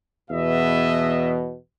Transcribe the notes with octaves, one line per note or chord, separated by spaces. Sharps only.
E2 B2 D#5 E5